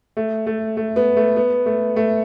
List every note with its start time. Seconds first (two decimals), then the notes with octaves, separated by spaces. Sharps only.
0.17 A3
0.47 A3
0.77 A3
0.96 B3
1.17 A3
1.36 B3
1.66 A3
1.96 A3